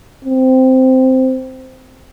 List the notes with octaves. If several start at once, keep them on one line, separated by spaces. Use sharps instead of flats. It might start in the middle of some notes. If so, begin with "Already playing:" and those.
C4